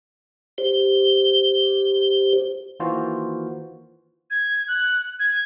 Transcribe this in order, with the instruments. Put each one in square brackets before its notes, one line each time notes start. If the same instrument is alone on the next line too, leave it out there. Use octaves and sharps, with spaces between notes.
[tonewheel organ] G4 C5
[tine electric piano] D#3 E3 A#3 F4 F#4 C5
[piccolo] G#6
F#6
G#6